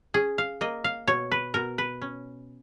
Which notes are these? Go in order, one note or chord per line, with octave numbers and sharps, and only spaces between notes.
C#4 G#4
F5
A#3 D#5
F5
B2 C#5
B4
B2 A#4
B4
C#4